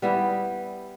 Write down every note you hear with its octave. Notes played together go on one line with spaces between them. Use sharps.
G3 B3 E4 G4